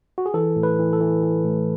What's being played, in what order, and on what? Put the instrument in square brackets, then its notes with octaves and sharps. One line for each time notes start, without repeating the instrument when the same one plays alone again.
[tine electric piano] F#4
G#4
E3 A4
A2
B4
E3
A4
E3
E3
A2